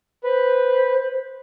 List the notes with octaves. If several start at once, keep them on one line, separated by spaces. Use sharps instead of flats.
B4 C5